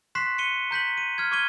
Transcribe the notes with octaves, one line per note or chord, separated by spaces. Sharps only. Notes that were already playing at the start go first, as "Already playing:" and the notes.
C6 C#6 F#6 B6 C7 E7
C#7 D#7 G7
A#5 G6 B6 F#7
D#7
F6 G#6
C#6 D6 F6 G#6 D#7 G7